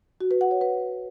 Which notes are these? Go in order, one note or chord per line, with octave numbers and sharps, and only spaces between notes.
F#4
B4
F#5
C#5
B4